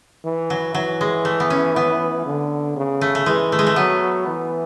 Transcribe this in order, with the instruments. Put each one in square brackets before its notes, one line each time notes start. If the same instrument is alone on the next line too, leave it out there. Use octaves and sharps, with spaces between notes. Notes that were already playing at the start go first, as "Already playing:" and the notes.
[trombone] E3
[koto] F#3
[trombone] E3 [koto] F#3
[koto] G#3
A3
B3
C#4
B3
[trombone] D3
C#3
[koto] A3
A3
[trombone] E3 [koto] G#3
[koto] A3
G#3
A3
[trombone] F#3 [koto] B3
[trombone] E3